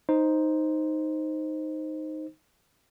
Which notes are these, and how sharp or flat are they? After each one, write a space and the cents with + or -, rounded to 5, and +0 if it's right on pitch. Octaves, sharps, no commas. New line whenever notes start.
D#4 +0 C5 +0